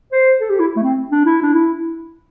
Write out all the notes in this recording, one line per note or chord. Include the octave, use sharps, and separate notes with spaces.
C5
A4
G4
E4
A3
C4
D4
E4
D4
E4